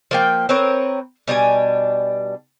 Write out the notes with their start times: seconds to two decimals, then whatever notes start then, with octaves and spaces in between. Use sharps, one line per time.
0.11 F3 A#3 G5
0.49 C4 A#4 B4 C#5
1.27 B2 G3 D4 G#5